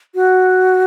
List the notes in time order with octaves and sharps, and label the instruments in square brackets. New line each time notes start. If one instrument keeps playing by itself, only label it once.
[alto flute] F#4